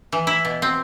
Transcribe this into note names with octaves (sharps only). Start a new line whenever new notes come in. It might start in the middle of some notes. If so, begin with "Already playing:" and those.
E3
E4
B2
C4